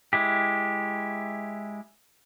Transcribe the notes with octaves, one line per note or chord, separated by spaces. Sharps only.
G#3 E4 G4